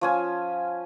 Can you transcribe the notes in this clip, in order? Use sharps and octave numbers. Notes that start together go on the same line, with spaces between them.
F3 C#4 G#5